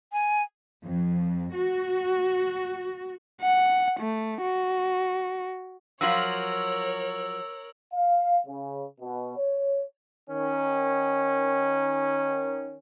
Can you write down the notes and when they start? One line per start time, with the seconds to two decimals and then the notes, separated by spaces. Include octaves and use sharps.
0.13 G#5
0.83 F2
1.54 F#4
3.42 F#5
4.00 A3
4.43 F#4
6.01 F3 F#3 F4 A#4 C#5 E6 F#7
7.93 F5
8.47 C#3
9.01 B2
9.37 C#5
10.27 D#3 C#4